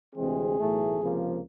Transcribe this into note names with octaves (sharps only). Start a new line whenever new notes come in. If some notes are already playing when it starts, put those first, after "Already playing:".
D2 C3 E3 G#3 C4 G#4
B1 A2 E3 A3
C#2 C3 F3 A#3